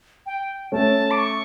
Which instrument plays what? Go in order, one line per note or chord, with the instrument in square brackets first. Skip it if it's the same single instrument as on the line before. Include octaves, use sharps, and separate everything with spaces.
[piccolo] G5
[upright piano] A3 C#4 [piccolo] A5
[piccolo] D6
C#6